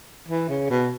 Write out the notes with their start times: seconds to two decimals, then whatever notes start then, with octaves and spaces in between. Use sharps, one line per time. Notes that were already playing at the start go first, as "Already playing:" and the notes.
0.28 E3
0.49 C#3
0.70 B2